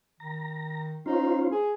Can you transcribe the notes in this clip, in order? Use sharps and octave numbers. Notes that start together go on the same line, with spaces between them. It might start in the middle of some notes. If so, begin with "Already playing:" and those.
D#3 A#5
C#4 D#4 F4 C5
G#4